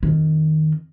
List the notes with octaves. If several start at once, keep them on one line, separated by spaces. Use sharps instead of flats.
F2 D#3